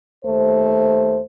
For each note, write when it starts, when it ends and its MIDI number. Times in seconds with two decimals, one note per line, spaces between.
0.24 1.20 39
0.24 1.20 57
0.24 1.20 72